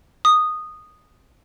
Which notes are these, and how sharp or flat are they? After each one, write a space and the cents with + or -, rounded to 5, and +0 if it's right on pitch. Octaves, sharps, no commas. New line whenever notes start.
D#6 -10